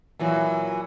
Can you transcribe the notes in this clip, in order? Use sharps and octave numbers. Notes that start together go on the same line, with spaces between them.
A#2 E3 F#3